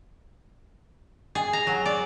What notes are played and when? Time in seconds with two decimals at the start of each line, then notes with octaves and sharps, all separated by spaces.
1.35 G#4
1.53 A#5
1.67 F#3
1.85 D5